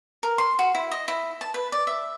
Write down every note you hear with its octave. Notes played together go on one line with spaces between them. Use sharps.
A#4
C6
F#4
E4
D#5
E4
A5
B4
D5
E5